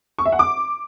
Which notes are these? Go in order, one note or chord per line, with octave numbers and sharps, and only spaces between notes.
C#6
E5
F#5
D6